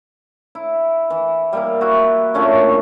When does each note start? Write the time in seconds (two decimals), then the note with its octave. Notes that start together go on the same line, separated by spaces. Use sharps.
0.55 E4
1.10 E3
1.53 G3 A#3 E4
1.81 E4 F#4
2.34 A#2 A3 C#4 D4